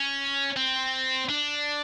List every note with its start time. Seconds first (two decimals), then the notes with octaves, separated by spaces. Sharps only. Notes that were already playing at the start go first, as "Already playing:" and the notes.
Already playing: C#4
0.56 C4
1.30 D4